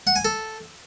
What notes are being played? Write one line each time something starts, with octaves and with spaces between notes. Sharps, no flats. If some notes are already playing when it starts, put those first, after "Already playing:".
F#5
G#5
A4